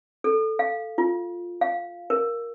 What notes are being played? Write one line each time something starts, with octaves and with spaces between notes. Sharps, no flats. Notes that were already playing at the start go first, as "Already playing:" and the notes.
A4
F5
F4
F5
A#4